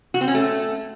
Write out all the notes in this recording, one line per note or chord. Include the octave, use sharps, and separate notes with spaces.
F#4
C4
C#4
A3